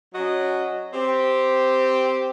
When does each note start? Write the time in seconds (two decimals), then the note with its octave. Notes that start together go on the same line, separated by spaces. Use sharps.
0.14 F#3 C#4 F#4 D#5
0.93 C4 G4